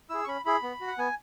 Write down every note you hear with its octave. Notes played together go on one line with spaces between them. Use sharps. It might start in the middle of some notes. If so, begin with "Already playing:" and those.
E4 G#4 E6
C#6
C#4 B5
E4 G#4 B5
B3
F#4
F#5
B3 G#5